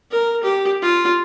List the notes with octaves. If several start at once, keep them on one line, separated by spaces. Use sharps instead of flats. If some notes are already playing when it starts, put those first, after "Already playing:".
A#4
G4
F4